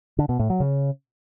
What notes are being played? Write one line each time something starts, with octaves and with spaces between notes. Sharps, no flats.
D3
B2
A2
F#3
C#3